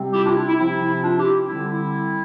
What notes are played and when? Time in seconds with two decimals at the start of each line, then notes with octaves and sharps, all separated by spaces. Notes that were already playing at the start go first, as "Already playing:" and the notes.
Already playing: C3 G3 C4
0.13 E4 G4
0.24 D4 F4
0.35 E4
0.47 E4
0.58 C3 F3 C4 E4
1.02 D4 F4
1.18 E4 G4
1.47 D3 G3 C4 E4
1.70 E4